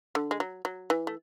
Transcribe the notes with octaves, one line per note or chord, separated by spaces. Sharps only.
D3
G#3
F#3
F#3
E3
A3